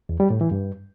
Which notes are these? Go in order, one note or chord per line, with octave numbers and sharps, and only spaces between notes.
E2
G3
A2
E3
G2